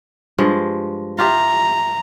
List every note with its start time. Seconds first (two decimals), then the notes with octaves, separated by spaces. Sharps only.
0.38 G2 F3 G#3
1.18 F4 G4 E5 A#5